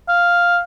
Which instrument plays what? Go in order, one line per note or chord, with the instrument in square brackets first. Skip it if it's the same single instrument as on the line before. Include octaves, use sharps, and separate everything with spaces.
[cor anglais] F5